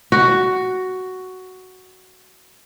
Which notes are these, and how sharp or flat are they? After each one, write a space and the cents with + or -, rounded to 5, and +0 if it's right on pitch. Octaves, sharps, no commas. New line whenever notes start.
F#4 +5